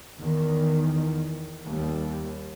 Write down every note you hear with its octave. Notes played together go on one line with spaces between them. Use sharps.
E2 D#3
D#2 G3